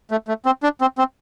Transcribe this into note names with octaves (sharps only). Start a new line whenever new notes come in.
A3
A3
C4
D4
C4
C4